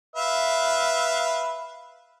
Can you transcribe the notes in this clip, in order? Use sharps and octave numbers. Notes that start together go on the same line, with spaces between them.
B4 E5 F5